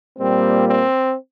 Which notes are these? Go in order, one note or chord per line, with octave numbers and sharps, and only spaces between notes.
A#2 G3 A#3 C4
C4